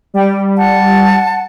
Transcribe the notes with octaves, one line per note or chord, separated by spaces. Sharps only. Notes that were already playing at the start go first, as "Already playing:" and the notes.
G3 G5
F#5 A5